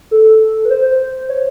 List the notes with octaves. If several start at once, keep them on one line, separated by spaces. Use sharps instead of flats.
A4
B4
C5
C#5